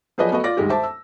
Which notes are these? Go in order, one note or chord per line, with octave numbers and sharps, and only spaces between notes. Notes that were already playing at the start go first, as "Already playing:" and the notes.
F3 F#3 G#4 B4 D5 D#5
A3 B3 F#4 D#5
F4 D5 D6 A#6
D2 G2 D#3 G#3 G4
C5 E5 A5 D6
E6